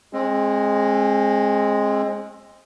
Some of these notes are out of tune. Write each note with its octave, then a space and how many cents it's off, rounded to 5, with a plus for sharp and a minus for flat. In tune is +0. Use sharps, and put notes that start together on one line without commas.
G#3 +0 C4 +30